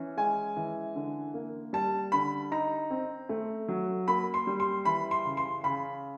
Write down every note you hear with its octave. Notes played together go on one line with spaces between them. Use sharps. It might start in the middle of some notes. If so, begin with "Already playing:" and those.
Already playing: E3 C#4
G#3 G#5
E3
D3
A#3
G3 A5
D3 B5
D#4 A#5
C4
A3
F#3
A#3 B5
C6
G3
C6
E3 B5
C6
C#3
C6
C#3 B5